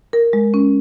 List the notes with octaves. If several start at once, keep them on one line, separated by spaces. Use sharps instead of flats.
A#4
G#3
C#4